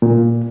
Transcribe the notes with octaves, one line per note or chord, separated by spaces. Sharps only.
A#2